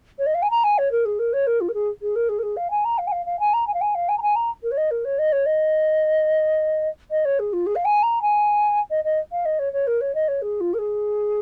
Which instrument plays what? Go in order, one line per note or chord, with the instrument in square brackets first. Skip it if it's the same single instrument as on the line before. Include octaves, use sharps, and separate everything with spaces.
[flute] C#5
D#5
F5
G#5
A#5
G#5
C#5
A#4
G#4
A#4
C#5
A#4
F4
A#4
G#4
G#4
A#4
G#4
A#4
G#4
F5
G#5
A#5
F5
G#5
F5
F5
G#5
A#5
G#5
F5
G#5
F5
G#5
A#5
G#5
A#5
A#4
C#5
D#5
A#4
C#5
D#5
C#5
D#5
D#5
C#5
G#4
F4
G#4
F5
G#5
A#5
G#5
D#5
D#5
F5
D#5
C#5
C#5
A#4
C#5
D#5
C#5
G#4
F4
A#4
G#4